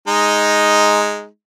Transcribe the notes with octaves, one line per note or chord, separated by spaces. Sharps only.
G#3 D#4